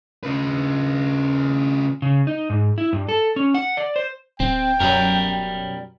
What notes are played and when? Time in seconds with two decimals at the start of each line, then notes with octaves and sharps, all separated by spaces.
0.23 C#3 B4
2.02 C#3
2.27 D#4
2.50 G#2
2.78 E4
2.93 G2
3.09 A4
3.36 C#4
3.54 F#5
3.77 D5
3.96 C5
4.40 D1 C4 G5
4.80 F#2 B2 F#3 G3 A#4